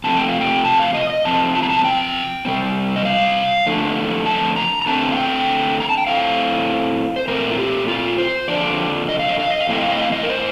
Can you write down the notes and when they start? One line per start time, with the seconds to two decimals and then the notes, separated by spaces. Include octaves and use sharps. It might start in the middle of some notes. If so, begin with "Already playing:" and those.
0.04 C3 F3 A3 C4 A5
0.16 G5
0.28 F5
0.41 G5
0.65 A5
0.79 F5
0.94 D#5
1.10 D#5
1.25 C3 F3 C4 A5
1.55 A5
1.63 A#5
1.69 A5
1.85 G5
2.45 C3 G3 C4
2.96 D#5
3.05 F5
3.66 F2 D3 A3
4.26 A5
4.56 A#5
4.82 A#5
4.86 D3 A3 C4 A5
5.12 F5
5.17 G5
5.80 A#5
5.90 A5
5.98 G5
6.07 A2 A3 C4 F5
7.16 C5
7.28 A#2 A3 C4 A#4
7.51 F4
7.58 G4
7.88 F4
8.18 C5
8.48 F2 D3 F3 D4 D5
9.09 D#5
9.19 F5
9.29 D#5
9.39 F5
9.50 D#5
9.60 F5
9.69 A2 A3 C4 D#5
9.81 F5
9.92 D#5
10.02 F5
10.12 D#5
10.23 A#4
10.29 C5